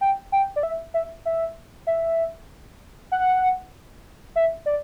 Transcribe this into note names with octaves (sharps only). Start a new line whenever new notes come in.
G5
G5
D5
E5
E5
E5
E5
F#5
E5
D5